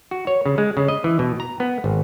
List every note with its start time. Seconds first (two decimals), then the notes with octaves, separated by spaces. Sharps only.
0.11 F#4
0.27 C#5
0.46 C#3
0.58 G#3
0.77 C#3
0.88 D#5
1.04 E3
1.19 B2
1.40 A#5
1.60 B3
1.84 G#1